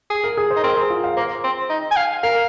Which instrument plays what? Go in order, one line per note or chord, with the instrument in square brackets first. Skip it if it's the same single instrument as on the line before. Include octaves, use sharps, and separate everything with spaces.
[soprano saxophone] G#4
[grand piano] A#4
G#4
C5
[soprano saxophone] D#4
[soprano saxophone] C4 [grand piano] A#4
[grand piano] G#4
F4
F5
[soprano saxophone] A#3 [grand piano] C5
[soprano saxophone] C4
D#4
G#5
F5
[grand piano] A#4 [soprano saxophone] F5